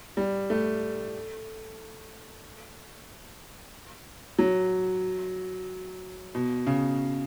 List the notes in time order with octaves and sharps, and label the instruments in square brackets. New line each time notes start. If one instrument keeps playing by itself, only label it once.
[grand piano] G3
A3
F#3
B2
C#3